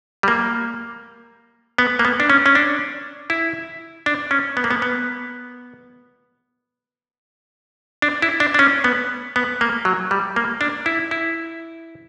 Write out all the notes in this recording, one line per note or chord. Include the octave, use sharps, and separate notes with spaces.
G3
A#3
B3
A#3
B3
D4
C#4
C#4
D4
E4
D4
C#4
B3
A#3
B3
B3
D4
E4
D4
D4
C#4
B3
B3
A#3
F#3
G3
A#3
D4
E4
E4